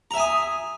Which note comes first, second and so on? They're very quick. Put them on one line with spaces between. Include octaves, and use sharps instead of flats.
A#5 E5 G#5 D#6